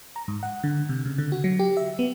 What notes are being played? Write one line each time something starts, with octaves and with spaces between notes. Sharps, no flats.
A#5
G#2
F#5
D3
C3
C#3
D3
F#4
F#3
G4
E5
B3